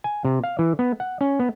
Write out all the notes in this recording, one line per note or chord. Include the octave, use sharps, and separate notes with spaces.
G#5
C3
F5
E3
B3
F#5
C#4
B3